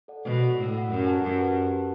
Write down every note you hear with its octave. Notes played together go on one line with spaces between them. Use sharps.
A4 D5 F#5
B2 F#4
A4 D5 F#5
A2 F#4
A4 D5 F#5
F#2 G4
B4 F#5 A5
F#2 G4
B4 F#5 A5
G4
B4 F#5 A5